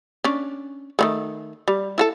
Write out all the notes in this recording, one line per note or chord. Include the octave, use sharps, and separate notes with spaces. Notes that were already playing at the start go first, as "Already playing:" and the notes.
C#4 D4
D#3 F#3 A3
G3
E4 F#4 A4